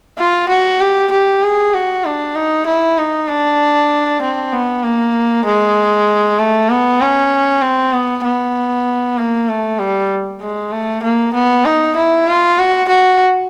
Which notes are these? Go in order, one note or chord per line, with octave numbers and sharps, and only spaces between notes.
F4
F#4
G4
G4
G#4
F#4
D4
D#4
E4
D#4
D4
C4
B3
A#3
G#3
A3
B3
C#4
C4
B3
B3
A#3
A3
G3
G#3
A3
A#3
B3
D#4
E4
F4
F#4
F#4